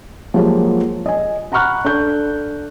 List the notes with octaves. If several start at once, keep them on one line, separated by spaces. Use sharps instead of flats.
F3 F#3 G#3 A#3 F#4 G4
D#5 G#5
F#5 A#5 B5 C#6 F6 F#6
D4 A4 G6